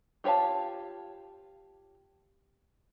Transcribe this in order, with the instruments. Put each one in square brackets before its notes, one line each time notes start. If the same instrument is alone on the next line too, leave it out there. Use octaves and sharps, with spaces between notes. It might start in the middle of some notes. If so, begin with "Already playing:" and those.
[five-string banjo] F4 G4 C#5 F5 A5